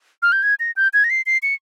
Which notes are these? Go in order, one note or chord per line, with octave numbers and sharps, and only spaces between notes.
F6
G6
G#6
A#6
G6
G#6
A#6
C7
C7
C#7